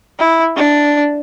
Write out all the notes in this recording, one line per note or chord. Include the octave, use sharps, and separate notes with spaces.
E4
D4